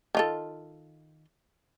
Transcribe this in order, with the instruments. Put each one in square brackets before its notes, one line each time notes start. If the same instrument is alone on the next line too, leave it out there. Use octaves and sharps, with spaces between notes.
[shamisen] D#3 F4 A4